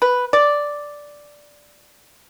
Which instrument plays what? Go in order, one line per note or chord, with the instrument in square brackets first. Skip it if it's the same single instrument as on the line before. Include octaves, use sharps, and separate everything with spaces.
[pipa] B4
D5